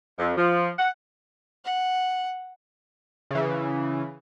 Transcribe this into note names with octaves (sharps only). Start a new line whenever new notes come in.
F2
F3
F#5
F#5
C#3 E3